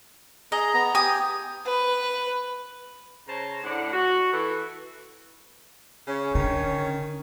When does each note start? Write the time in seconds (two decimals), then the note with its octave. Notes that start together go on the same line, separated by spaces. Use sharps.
0.52 G#4 D#5 A#5
0.74 B3 A#5
0.95 G4 G5 G#5 D#6
1.66 B4
3.27 C#3 C5 C#5 A5 A#5
3.63 A2 D3 F#5
3.93 F#4
4.32 E3 A4
6.07 C#3 C#4
6.35 D3 D#3